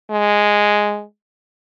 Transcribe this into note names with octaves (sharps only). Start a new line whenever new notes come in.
G#3